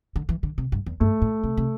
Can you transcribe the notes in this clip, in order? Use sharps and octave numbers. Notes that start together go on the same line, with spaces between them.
D3
E3
D3
C3
G2
E2
G2 A3
A2
C3
C3